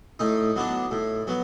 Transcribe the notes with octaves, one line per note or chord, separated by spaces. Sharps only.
A2 D#4
F#3 B3 D4
A2
F#3 B3